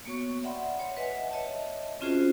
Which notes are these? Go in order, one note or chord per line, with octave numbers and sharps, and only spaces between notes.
A#3 B3 F#4 C#5 C#6
D5 E5 F#5 G5 B5 C6
C#5
B4 D#5 E5 F#5 G#5
C#5 D#5 E5 A5
C4 C#4 F4 F#4 G#4 C5